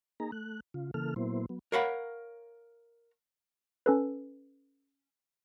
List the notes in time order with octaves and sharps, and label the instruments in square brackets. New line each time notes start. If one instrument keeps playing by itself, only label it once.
[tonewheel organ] A#3 D#4 G#4 A#5
A3 F#6
C#3 F4
C#3 E3 A#3 A4 F6
A#2 F#3 A#3 B3 E4 C5
F#3 B3
[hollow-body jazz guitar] A#4 C#5 F5 F#5 A#5 B5
[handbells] C#4 A4 B4